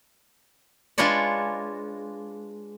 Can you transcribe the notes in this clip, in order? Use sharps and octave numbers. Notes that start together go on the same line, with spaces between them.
G#3 D4 F4 B4 C#5 D5